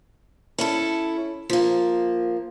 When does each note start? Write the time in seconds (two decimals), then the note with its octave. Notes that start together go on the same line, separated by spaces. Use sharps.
0.58 C#4 E4 A4
1.50 F3 A#3